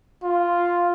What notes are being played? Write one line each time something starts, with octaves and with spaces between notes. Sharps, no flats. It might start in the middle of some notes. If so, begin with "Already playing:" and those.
F4